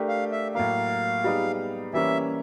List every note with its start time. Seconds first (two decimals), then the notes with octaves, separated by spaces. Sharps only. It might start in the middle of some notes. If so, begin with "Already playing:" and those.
Already playing: A3 D4 G4 A#4
0.08 F5
0.32 E5
0.55 A2 F#3 A#3 F5
1.24 G3 B3 D#4 G#4
1.93 E3 G3 A#3 C#4 E5